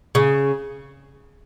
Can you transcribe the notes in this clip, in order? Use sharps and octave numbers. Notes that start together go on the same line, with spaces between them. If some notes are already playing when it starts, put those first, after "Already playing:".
C#3